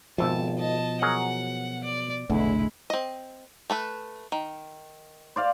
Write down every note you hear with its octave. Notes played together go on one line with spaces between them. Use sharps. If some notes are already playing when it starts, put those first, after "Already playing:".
G#1 F2 B2 F3 E5 A5
D#5 A5
F#3 G#4 A#4 F#5
D5
F1 B1 E2 D3 G#3 A3 E4
C4 D#5
A3 A4 B4
D#3
C5 D5 F5